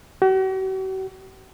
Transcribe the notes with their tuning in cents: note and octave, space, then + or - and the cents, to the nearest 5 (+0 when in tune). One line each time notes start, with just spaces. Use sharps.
F#4 +45